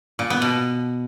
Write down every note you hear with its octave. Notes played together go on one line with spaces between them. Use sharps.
A#2
B3
B2